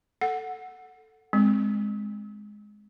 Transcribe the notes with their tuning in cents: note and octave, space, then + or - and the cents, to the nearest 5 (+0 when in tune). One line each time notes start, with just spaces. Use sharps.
A4 +0 F#5 +0
G#3 +5 C4 +0